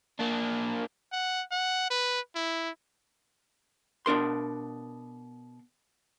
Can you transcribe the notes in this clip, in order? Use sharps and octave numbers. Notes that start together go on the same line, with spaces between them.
A#3 D4
F#5
F#5
B4
E4
B2 D4 A#4 C6